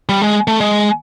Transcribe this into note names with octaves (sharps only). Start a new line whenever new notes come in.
G3
G#3
A3
G#3